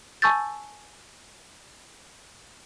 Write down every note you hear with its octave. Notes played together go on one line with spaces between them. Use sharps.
G#5 A5 C#6 E6 G6 A6